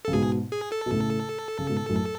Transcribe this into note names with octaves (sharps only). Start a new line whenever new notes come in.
A4
C#3
G#2 B2 G#4
G#4
A4
B2
A2 C#3
C#3
G#2 B2
F#2 A2